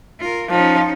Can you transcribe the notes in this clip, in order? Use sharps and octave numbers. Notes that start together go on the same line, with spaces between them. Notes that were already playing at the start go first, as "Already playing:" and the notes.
F4 A#4
F3 C#4 D#4